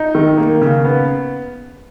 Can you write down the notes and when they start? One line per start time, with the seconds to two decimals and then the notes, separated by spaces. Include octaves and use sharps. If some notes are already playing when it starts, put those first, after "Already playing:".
Already playing: D#4
0.15 D#3
0.38 A#3
0.61 C#3
0.85 B3